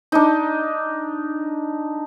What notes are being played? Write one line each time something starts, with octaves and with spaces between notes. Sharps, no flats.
D4 D#4